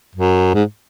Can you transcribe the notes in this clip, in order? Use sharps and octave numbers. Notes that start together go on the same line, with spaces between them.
F#2
G#2